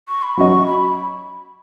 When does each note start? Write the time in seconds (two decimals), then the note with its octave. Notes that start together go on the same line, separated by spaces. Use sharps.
0.09 C#6
0.23 B5
0.37 F#3 C#4 F#4 D#5 C#6
0.67 B5